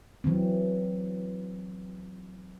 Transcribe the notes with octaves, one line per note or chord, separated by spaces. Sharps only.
E3 F#3 C4